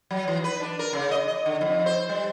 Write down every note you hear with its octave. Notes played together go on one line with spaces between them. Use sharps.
F#3
E3
B4
D4
A#4
C#3
D#5
D#5
D3
F2
C5
G3